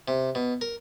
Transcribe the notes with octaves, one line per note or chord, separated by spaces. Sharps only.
C3
B2
A#4